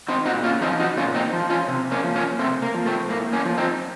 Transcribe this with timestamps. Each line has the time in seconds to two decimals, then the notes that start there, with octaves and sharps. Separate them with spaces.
0.08 C4 D#4
0.25 A#2 D#4 F#4
0.44 C#4 F4
0.61 F3 C4 D#4
0.80 D#4 F#4
0.97 A#2 C#4 F4
1.15 C4 D#4
1.33 F3
1.50 C#4 F4
1.68 C3
1.92 A#3 C#4
2.04 F3
2.16 A#3 C#4
2.39 C3 A3 C4
2.62 A#3
2.75 F3
2.86 A3 C4
3.09 A2 A#3
3.33 A#3 C#4
3.45 F3
3.57 C4 D#4